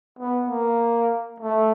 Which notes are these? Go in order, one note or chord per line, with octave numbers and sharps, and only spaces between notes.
B3
A#3
A3